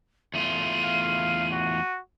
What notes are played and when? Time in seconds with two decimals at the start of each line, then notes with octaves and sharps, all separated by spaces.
0.34 E2 A3 F4 D#7
0.83 F5
1.52 F#4